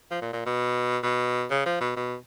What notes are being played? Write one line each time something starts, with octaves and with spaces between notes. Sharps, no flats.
F3
A#2
A#2
B2
B2
C#3
F3
B2
B2